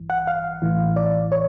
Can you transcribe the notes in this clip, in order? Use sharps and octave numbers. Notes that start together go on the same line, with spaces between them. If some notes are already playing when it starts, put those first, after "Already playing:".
Already playing: A1 G2 E3
F#5
F5
A1 A2 E3
D5
C#5